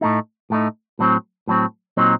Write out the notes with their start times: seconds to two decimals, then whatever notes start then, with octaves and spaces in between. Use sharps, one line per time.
0.01 A2 A3 D#4
0.50 A2 A3 D#4
0.99 A2 F#3 C4
1.47 A2 F#3 C4
1.97 A#2 F#3 C4 D#4